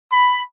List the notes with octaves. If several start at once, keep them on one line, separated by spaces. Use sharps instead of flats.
B5